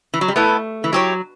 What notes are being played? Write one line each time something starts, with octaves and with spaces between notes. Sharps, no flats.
E3
F#3
G3
A3 B3 E4 A4
E3
F#3 E4 G4 C#5